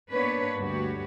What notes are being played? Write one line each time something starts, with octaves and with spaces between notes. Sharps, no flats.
A#3 B3 D4 B4 C#5
D2 G2 F#4 G4 B4 C#5